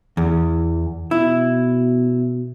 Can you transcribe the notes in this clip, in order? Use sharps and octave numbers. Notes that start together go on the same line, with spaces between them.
E2 E3
B2 E4